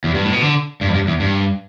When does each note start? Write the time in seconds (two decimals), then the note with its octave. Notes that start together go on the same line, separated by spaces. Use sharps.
0.04 E2
0.14 G2
0.23 A2
0.33 B2
0.41 D3
0.81 G2
0.89 E2
0.94 G2
1.07 E2
1.20 G2